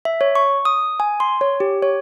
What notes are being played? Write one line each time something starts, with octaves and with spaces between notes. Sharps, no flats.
E5
C#5
C#6
D#6
G#5
C6
C#5
G4
C#5